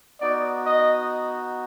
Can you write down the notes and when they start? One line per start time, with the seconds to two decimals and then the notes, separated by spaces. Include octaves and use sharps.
0.20 B3 D#4 F#4 D5
0.66 D#5